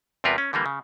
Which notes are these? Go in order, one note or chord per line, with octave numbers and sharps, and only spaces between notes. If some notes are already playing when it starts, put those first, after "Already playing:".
E2 C3 G3 F4 A#4 B4
C#4
D3 E3 G3 A#3
C#3